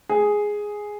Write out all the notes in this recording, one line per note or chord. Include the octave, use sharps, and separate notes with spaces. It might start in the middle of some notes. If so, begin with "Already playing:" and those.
G#4